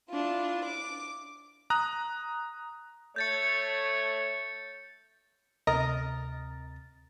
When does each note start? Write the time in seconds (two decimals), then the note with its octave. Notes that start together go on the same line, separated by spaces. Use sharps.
0.11 D4 E4 F4
0.65 D6
1.70 A#5 D#6 F#6
3.16 A3 C#5 G6 A6 C#7
5.67 D2 C3 A#4 D#5 A#5 A6